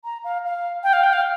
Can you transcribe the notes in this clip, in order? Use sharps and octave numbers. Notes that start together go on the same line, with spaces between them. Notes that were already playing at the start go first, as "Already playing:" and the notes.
A#5
F5
F5
G5
F5
G5
F5